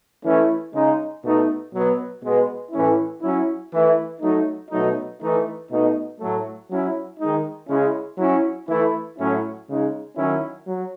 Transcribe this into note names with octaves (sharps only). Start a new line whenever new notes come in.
E3 A3 C#4 E4
C#3 G#3 D#4
B2 A3 D#4
B2 F#3 B3
B2 G#3 B3
A2 E3 A3 C#4 E4
F#3 C#4 E4
E3 A3 E4
F#3 A3 D#4
B2 F#3 A3 D#4
E3 A3 D#4
B2 A3 D#4
A2 F#3 A3
F#3 C#4 E4
D#3 G#3 D#4
C#3 G#3 C#4 E4
F#3 C#4 E4
E3 A3 E4
A2 F#3 C#4 E4
C#3 G#3 D#4
D#3 F#3 C#4 E4
F#3